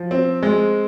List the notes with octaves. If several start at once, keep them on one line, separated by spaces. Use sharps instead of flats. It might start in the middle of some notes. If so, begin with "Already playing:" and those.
Already playing: F3
C4
G#3